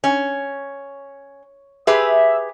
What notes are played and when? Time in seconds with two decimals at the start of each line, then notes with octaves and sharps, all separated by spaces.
0.04 C#4
1.87 G4 G#4 B4 E5